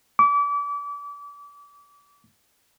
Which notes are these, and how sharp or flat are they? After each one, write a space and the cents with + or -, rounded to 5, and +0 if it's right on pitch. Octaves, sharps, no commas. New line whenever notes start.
D6 -35